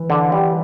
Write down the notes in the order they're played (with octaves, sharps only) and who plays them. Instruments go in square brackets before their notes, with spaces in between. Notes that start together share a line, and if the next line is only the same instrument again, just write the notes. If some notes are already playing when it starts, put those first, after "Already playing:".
Already playing: [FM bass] E3
[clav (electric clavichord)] D3
G3